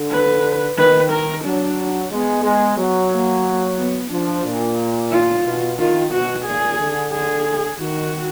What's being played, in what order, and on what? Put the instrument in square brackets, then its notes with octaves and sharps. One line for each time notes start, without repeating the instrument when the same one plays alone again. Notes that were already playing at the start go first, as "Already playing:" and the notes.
Already playing: [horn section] D3
[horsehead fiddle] B4
[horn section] D#3 [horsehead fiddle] B4
[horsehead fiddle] A#4
[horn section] F#3 [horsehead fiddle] D4
[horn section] G#3 [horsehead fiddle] B3
[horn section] G#3
F#3
[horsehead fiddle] A#3
B3
[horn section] F3 [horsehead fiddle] D4
[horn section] A#2
[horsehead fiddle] F4
[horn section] B2
[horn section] D#3 [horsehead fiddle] F4
[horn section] B2 [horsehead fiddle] F#4
[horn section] A#2 [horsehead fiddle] G#4
[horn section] D3
[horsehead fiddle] G#4
[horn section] D#3 [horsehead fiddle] F#4